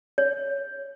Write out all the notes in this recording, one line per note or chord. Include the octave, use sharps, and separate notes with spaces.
C#5